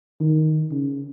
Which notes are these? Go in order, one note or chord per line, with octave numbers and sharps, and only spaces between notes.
D#3
C#3